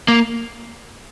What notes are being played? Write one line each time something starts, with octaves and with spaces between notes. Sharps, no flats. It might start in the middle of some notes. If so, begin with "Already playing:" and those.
A#3